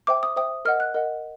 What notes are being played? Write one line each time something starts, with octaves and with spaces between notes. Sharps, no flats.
C5 E5 G5 D6
D#6
C5 E5 G5 D#6
A#4 D#5 F#5 F6
F#6
A#4 D#5 F#5